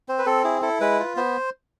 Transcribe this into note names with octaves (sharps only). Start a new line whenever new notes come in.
C4 C5
B4
C4 A4
E4 G#4
E4 A4
G#3 B4
F4
B3 C5